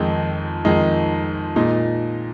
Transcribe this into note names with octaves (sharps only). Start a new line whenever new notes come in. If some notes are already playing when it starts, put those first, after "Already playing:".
Already playing: F2 D#3 G#3 D#4
F2 D#3 G#3 D#4
A#2 G#3 D#4